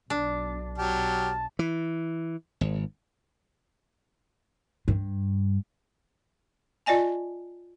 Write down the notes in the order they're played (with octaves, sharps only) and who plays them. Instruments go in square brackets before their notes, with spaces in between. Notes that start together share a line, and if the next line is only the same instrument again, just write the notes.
[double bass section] B1 [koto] D4
[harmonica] F#3 G4 F6 [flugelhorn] A5
[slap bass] E3
G#1
[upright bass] G2
[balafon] F4 D5 D#5 G#5 A5